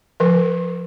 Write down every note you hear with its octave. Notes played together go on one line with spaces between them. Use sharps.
F3 A#4